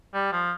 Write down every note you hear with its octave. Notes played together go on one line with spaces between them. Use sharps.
G3
F3